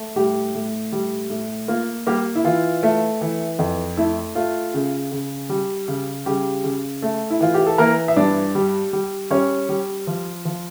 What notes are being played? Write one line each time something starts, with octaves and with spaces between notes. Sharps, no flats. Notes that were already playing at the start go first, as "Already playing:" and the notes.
Already playing: A3
A2 G3 G4
A2
G3
A2
A#3 F4
G3 A#3 G4
E4
E3 F4
A3
E3
F2
A3 E4
A3 F4
C#3
C#3
G3
C#3
C#3 G3 G4
C#3
A3
E4
E3 F4
G4
A4
E3 A#3 A#4
E5
G2 D4 D5
G3
G3
G3 C#4 C#5
G3
F3
F3